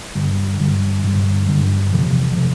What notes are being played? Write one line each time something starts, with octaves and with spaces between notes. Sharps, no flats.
G2 D3 G3
G2 D3 G3
G2 D3 G3
G2 D3 G3
E2 C3 F3
C3 F3